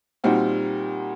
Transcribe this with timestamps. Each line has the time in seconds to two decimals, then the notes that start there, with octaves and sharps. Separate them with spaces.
0.24 A#2 G3 C4 D#4 F#4